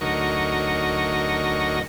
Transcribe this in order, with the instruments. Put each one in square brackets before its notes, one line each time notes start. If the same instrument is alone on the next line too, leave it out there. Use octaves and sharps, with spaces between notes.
[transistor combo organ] D2 F#3 D#4 A#4 C#6